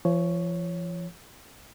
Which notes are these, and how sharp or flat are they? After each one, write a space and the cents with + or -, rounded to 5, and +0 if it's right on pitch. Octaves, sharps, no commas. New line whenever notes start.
F3 -35 C#5 +0